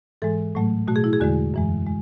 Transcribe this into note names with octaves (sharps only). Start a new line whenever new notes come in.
G#2 E3 G#3 A4
A2 F#3 A3
B2 A3 F#4
G#4
E4
G#4
E2 D3 G#3 F#4
F#2 E3 G#3
G#3